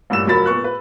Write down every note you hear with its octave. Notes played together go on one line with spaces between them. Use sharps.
A1 G2 A#2 E6 E7
F1 F#3 F4 A#4 B5 A6
A#2 B3 C#6 F#6
B4